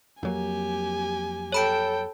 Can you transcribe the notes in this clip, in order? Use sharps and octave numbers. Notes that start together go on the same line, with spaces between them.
F2 F#3 A#3 G4 G#5
A4 C#5 G5 B5 D7